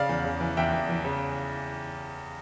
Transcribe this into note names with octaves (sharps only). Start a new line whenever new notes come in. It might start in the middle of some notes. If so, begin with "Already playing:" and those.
Already playing: C#3 D5 F5
E2
C#3
E3
E2 E5 G5
E2
E3
C#3